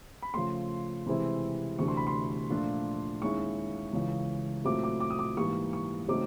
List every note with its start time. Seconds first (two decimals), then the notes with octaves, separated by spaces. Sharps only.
0.22 B5
0.34 C#3 F3 A3 C6
1.06 C3 E3 G#3 C4 E4
1.78 D2 C3 E3 A3 D4 C#6
1.88 C6
1.97 B5
2.07 C6
2.50 A#2 F3 A3 D4 F4
3.22 D#2 D#3 G#3 C#4 E4 C#6
3.93 C#2 C#3 E3
4.65 A#2 F#3 A3 C4 E4 D6
4.84 D6
5.00 D6
5.10 D#6
5.19 D6
5.37 G#2 E3 G3 A#3 C#6
5.73 C#6
6.08 C#3 F#3 A3 C4 D#4 D6